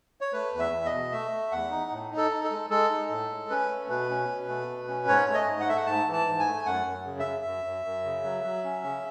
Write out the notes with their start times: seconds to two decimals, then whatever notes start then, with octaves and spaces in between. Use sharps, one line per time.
0.21 C#5
0.33 A3 B4
0.53 E2
0.59 E5
0.72 E2
0.86 D#5
0.92 B2
1.12 A3 E5
1.31 A3
1.51 E2 F#5
1.71 D#4
1.91 A2
2.11 D#4
2.17 A4
2.31 D#4
2.44 A4
2.51 G#3
2.70 G#3 A4
2.90 D#4
3.10 A2
3.29 G#3
3.50 C#4 B4
3.69 A3
3.89 B2 B4
4.09 C#4
4.29 B2
4.48 A3
4.68 B2
4.88 C#4
5.08 G#2 C#5
5.28 A3
5.34 D#5
5.47 G#2
5.60 F#5
5.67 A3 E5
5.77 F#5
5.86 G#2 A5
6.06 E3
6.13 A5
6.27 G#2
6.40 G#5
6.46 A3
6.66 F#2 F#5
6.86 F#2
7.05 C#3
7.19 E5
7.25 F#2
7.45 F#2
7.64 F#2
7.85 F#2
8.05 C#3
8.24 F#3
8.44 F#3
8.64 C#4
8.84 C#3